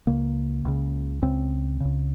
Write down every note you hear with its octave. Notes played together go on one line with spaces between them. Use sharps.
C#2 C#3 A#3
C#2 C#3
C#2 C#3 C4
C#2 C#3